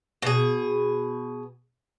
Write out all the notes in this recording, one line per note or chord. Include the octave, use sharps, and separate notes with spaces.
B2 G#4